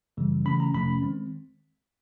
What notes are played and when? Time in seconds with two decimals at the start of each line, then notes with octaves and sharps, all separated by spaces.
0.17 F#2 C#3 E3 G3
0.45 C#3 E3 A3 C#4 B5
0.60 A#5
0.74 F2 C3 F3 A3 C#4 B5
1.02 D#3 G#3 C4